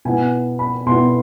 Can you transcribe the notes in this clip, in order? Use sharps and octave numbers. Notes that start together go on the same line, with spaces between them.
B2 B3 E4 G#5
B5
B2 B3 E4 C6